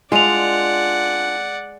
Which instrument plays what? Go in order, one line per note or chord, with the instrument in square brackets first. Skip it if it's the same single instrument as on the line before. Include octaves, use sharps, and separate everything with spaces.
[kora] G#3 [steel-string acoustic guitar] D4 F4 [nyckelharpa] D5 F#5 [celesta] G#5 F7